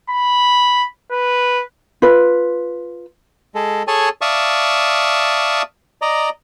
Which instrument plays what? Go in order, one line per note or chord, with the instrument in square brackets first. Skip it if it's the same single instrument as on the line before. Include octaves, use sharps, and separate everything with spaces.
[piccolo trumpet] B5
B4
[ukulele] F4 B4
[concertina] G#3 A4
G#4 A4 C#5 G#5 A5
D5 E5 F5 A5 C#6 D#6
D5 D#5 A#5